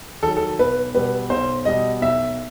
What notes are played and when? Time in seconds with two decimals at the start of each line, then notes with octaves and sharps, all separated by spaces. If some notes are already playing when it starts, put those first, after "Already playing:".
0.23 D#3 A4
0.26 F#3
0.37 A4
0.59 B1 B4
0.94 B2 G3 B4
1.30 B1 C5
1.65 B2 G3 D#5
2.01 B1 E5